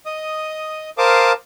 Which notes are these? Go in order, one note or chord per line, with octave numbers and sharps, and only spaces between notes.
D#5 D#6
A#4 C5 F5 A5 D6 D#6